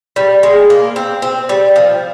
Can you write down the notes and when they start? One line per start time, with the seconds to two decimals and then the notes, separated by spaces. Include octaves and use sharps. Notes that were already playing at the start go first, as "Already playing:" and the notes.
0.16 G3
0.43 G#3
0.70 A#3
0.96 C4
1.22 C4
1.49 G3
1.76 F3